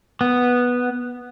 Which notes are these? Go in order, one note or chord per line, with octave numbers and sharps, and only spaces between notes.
B3